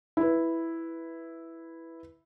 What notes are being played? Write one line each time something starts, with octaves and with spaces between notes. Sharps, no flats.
E4 B4